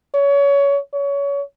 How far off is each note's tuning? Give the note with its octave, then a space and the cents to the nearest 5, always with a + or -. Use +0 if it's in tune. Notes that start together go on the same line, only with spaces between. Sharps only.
C#5 +25
C#5 +25